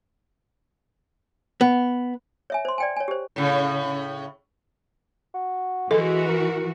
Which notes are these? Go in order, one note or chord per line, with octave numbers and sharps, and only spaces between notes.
B3
C#5 E5 G#5
C5 C6
D5 G5 G#5
C#5 G#5
G4 C5
A2 C#3
F#4
E3 G#3 F#4 A4
A#4